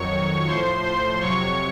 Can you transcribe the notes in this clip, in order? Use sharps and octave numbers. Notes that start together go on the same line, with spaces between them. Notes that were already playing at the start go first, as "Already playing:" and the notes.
Already playing: F2 D#3 F#3 C#5 C#6
A2 F3 C5 C6
C5 C6
F2 C3 F#3 C#5 C#6